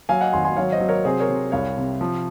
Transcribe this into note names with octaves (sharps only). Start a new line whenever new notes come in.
F#3 F5 G#5
D#5 F#5
G#1 G#5 C6
G#5 C6
F#3 C#5 F5
C5 D#5
F#3
A#4 C#5
C3 G#4 C5
A#4 C#5
C3
C2 C#5 F5
C3
F3